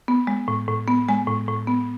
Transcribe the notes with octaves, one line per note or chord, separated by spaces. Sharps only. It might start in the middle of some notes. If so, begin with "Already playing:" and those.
B3
G#3
A2
A2
B3
G#3 G#5
A2
A2
B3